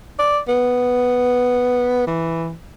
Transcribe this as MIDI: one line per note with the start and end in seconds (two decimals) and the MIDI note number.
0.19 0.39 74
0.48 2.07 59
2.07 2.54 52